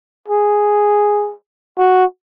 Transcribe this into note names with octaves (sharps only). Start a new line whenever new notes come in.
G#4
F#4